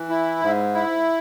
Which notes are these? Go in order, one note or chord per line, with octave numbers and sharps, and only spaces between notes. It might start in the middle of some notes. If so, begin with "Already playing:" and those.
Already playing: E3
E4
G#2
E4